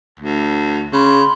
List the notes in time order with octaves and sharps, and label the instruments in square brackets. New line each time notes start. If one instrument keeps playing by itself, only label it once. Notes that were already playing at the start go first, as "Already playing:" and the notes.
[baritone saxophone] D2
[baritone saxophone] C#3 [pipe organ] B5 C6